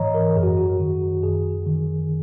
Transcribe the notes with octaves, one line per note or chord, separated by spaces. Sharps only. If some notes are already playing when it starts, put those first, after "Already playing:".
Already playing: G#2 E3 C#5 D#5 A#5
A#4
F#2 G#4
F#4
F#4
D#3
F#2 G#4
D#3